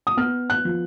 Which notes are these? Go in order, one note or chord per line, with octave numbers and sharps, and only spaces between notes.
D#6
B3 F6
F#6
F3